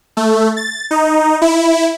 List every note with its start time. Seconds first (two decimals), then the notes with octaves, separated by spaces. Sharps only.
0.17 A3
0.57 A6
0.91 D#4
1.42 E4